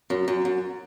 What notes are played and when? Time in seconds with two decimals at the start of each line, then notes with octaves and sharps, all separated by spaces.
0.10 F#2
0.28 F#2
0.45 F#2